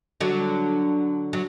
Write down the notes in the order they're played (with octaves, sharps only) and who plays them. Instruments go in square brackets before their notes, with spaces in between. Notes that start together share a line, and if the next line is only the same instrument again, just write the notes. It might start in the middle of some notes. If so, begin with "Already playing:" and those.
[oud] D3 F#3
F#3